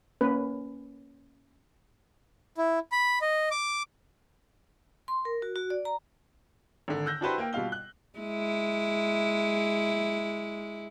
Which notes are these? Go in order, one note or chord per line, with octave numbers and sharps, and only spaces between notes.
A#3 C#4 B4
E4
B5
D#5
D6
C6
A#4
F#4
F#4
D5
A#5
G#1 D3
E6 F#6 G6 A#6
D4 E4 F#4 G4 B4 C5
A#3 A#4 G5
B2 G3 F4 F5 G7
F#6
G#3 E4